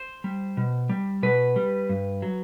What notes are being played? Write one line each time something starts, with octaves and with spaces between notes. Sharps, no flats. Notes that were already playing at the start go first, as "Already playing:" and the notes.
Already playing: C5
G3
B2
G3
B2 B4
G3
G2
F#3